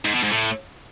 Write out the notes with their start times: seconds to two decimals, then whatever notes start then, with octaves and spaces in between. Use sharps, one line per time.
0.05 G#2
0.14 B2
0.23 G#2
0.32 A2